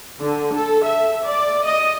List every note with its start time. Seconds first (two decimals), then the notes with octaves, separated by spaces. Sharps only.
0.21 D3
0.54 A4
0.85 E5
1.27 D5
1.65 D#5